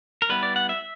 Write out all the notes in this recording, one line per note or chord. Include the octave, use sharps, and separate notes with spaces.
A#4
G3 B3 E4 B4
D5
F#5
E5